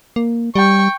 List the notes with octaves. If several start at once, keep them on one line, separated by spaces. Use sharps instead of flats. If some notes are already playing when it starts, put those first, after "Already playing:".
A#3
G3 G5 C#6